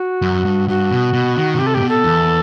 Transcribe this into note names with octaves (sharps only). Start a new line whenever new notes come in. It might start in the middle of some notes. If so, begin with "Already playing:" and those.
Already playing: F#4
F#2
G2
G2 F#4
B2
B2
D#3
B2
C3 G4
A4
A2 G4
B2
A4
E2